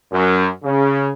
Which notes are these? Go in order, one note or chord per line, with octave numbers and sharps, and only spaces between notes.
F#2
C#3